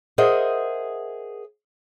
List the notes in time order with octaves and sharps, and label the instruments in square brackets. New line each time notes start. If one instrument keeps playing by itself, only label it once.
[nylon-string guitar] G#4 A#4 C5 D#5 E5 F#5